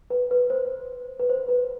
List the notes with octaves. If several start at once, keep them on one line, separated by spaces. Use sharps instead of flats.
B4
B4
C5
B4
C5
B4